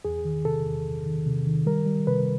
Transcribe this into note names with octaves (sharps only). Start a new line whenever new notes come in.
E2 G#4
D#3
C3 A4
E2
E2
D#3
C3
D#3
G3 A#4
G3
C3 B4